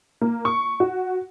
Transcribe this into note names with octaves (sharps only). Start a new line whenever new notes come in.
A#3
C#6
F#4